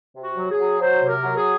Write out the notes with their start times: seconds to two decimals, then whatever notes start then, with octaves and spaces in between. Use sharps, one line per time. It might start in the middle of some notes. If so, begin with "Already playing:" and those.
0.15 C3
0.23 F#4
0.37 F#3
0.51 G#4
0.59 F#3
0.80 F#3 C5
1.02 C3
1.09 A#4
1.22 F#3
1.37 G#4